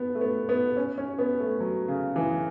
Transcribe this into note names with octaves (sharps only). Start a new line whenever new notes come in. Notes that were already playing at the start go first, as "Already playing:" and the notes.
Already playing: B3
A3
B3
B3
C#4
C#4
B3
A3
F#3
C#3
E3